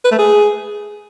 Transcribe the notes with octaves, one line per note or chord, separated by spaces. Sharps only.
B4
A3
G#4